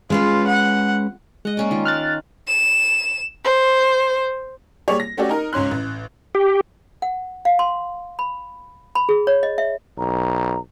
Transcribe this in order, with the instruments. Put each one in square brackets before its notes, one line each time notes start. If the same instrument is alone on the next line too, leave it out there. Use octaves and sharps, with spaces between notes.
[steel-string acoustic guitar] G#3 C#4 B4 [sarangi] F4
[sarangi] F#5
[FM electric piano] G#3 [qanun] D#5 F#5
[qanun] A#3 C#4 D5
D#3 F4
[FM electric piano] F6 F#6 A6
[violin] E7
C5
[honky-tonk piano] G3 A#3 G#4 C#5 D5
A#6
A3 C#4 F#4 G4 A4 D5
D#4 A#4
C#2 G#2 C#4 C6 F#6
A1
[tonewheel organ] G4
[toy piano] F#5
F5
C6
B5
B5
G#4
C#5
D#5
E5
[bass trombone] B1 [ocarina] A#5